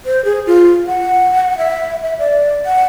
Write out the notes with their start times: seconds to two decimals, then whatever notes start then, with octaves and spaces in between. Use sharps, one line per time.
0.06 C5
0.25 G#4
0.47 F4
0.87 F#5
1.58 E5
2.03 E5
2.19 D5
2.66 F#5